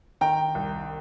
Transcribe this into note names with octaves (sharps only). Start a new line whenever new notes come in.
D#3 G5 A#5
C2